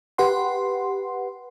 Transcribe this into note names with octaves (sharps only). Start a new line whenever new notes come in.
G4 B4 F#5 C6